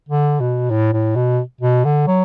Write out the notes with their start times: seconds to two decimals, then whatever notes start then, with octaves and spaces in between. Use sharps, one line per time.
0.09 D3
0.40 B2
0.70 A2
0.93 A2
1.16 B2
1.61 B2
1.85 D3
2.07 F#3